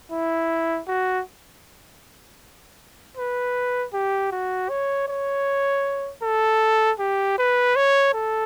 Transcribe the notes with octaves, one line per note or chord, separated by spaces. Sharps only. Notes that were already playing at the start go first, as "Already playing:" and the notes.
E4
F#4
B4
G4
F#4
C#5
C#5
A4
G4
B4
C#5
A4